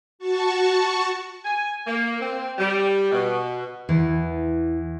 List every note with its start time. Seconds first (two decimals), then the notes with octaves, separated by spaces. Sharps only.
0.19 F#4 A5 C#6
1.45 G#5
1.86 A#3
2.21 C4
2.58 G3
3.12 B2
3.89 E2 E3